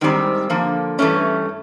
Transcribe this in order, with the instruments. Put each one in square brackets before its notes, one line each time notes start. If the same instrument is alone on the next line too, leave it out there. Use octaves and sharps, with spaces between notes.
[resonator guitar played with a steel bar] G#2 D#3 G3 C4
D3 F3 A#3
G2 E3 A3 C#4